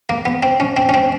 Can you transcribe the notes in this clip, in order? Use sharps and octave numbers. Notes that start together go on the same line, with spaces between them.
A#3
B3
C4
C#4
C4
C#4
C4